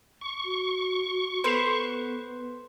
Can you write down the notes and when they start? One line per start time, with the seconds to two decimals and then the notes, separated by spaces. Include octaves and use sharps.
0.21 C#6
0.45 F#4
1.44 B3 A4 B4 C5 C7 E7